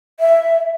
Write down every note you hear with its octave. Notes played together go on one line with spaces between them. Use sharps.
E5